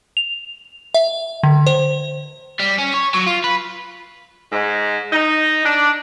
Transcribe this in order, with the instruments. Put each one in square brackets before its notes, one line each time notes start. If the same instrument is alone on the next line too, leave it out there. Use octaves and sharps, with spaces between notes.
[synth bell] F7
E5
D3
C5
[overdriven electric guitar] G3
C#4
C#5
F#3
F4
B4
[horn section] G#2
D#4
D4